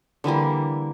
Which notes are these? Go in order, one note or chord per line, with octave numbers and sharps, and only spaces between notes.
D3 E3 G3 A#3